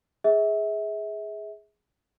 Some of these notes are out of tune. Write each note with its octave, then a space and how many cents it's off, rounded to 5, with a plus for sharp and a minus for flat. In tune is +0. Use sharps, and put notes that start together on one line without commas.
G#4 +0 E5 -30